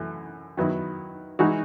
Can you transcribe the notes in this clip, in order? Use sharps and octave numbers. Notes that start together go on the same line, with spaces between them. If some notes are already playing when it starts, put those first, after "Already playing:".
Already playing: F#2 E3 A3 E4
D#3 F#3 B3 E4
E3 G#3 D#4 F#4